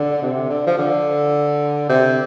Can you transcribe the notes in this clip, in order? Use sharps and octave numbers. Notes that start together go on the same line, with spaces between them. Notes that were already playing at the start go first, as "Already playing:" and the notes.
Already playing: D3
C3
D3
F3
D3
C3